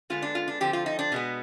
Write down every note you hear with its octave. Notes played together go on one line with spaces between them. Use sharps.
D3 G#3 B3 F4
D4
F4
D4
D3 F3 C4 G4
F4
D#4
D4
B2 G#3 B3